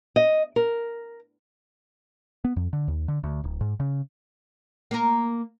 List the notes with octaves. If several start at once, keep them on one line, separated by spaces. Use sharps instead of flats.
D#5
A#4
B3
F2
D3
D#2
D3
D2
D1
G#2
C#3
A#3 A#4